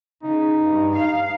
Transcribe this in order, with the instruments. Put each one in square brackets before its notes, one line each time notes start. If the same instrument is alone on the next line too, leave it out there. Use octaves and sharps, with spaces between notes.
[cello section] C#3 [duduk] D#4
[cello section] G2
F5